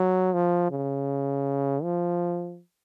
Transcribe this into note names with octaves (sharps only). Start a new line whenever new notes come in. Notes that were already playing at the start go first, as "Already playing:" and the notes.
Already playing: F#3
F3
C#3
F3